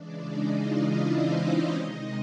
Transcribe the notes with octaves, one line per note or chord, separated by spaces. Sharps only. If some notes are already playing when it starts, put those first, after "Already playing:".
Already playing: C#3 E3 G#3 D4 D5
D#4 D#5
F4 F5
E4 E5
C4 C5
C#4 C#5
C3 D#3 G#3 D#4 D#5